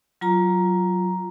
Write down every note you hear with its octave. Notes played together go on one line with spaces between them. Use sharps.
F#3 F4 A#5